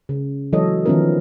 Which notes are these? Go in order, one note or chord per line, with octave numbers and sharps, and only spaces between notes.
C#3
E3 F#3 G#3 A4 C#5 D#5
D#3 F3 B3 C#4 E4 A#4